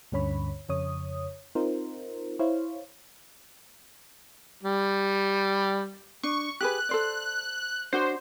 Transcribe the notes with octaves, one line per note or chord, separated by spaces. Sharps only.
D2 G2 D3 C#4 C#5 B5
F2 C#3 C#5 D#6
C4 D#4 F4 A#4 C5
E4 C5 C#5 F5
G3
D4 C#6
G4 G#4 B4 F#6
A4 C5 D5
D4 F#4 C5 C#5